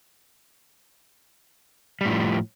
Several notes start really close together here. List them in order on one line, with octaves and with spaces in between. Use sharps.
G3 A2 F3